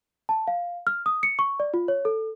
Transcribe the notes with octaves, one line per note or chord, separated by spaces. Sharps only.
A5
F5
F6
D#6
C#7
C#6
D5
F4
C#5
A4